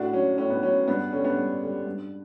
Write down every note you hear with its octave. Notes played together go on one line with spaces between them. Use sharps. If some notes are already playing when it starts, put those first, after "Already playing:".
Already playing: A2 D4 F#4
F#3 C#4
A2 C#4
B3
F#3 C#4
G2 B3 D4
D3 G3 C#4
B3 D4
G2
D3 G3
G2